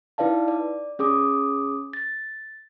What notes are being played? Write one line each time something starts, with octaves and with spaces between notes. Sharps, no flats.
D#4 E4 B4 D5 F5 A5
D5
C#4 G#4 D6 D#6
A6